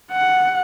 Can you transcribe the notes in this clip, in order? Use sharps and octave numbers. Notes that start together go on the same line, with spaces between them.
F#5